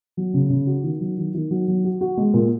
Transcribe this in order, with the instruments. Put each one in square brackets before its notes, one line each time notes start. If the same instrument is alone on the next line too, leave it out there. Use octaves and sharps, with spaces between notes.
[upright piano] F#3
C#3
C#3
F#4
D#3
F#3
D#3
D#3
F#3
F#3
F#4
F#4
G#3
A#2